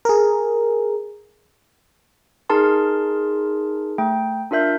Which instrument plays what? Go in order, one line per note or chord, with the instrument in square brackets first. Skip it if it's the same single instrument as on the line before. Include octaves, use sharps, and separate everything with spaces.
[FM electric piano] G#4 A#4
[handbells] D#4 G#4 A#4 A5 C6
A3 G5
D4 F4 A#4 E5 G6